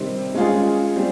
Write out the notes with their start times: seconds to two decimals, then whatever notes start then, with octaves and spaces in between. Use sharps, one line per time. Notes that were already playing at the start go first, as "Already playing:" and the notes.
Already playing: C3 D#3 G3 C4
0.34 G#3 C#4 F4 G#4
0.96 G3 C4